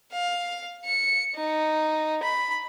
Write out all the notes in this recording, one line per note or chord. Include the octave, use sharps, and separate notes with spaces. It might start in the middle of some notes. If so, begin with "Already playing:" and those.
F5
C#7
D#4
B5